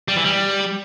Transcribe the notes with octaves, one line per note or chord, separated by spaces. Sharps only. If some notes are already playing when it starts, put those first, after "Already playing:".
G3
E3
G3